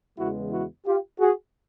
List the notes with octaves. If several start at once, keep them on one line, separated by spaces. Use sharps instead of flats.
E2 C#3 E3 G#3 B3 E4 F#4
E4 F#4
F4 G4
F#4 G#4